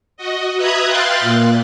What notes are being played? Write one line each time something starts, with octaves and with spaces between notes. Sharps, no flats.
F#4 D#5
B4 E5 A#5 D#6 F#6 G#6
F5 G5 C6 F#6 A6
A#2